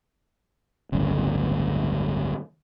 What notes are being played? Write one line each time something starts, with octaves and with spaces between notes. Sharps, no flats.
D1 G1 C#3